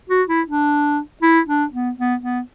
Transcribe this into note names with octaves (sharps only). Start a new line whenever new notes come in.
F#4
E4
D4
E4
D4
B3
B3
B3